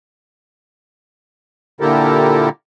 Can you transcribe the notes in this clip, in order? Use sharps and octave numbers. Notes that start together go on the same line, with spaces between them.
A#2 D3 E4 G4 A4 A#4